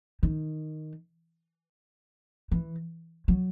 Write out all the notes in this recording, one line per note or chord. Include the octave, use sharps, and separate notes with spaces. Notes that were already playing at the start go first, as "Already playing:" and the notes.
D#3
E3
F#3